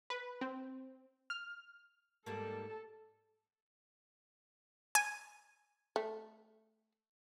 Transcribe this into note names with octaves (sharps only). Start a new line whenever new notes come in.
B4
C4
F6
G#2 G3 A#3 A4 A5
G#5
A3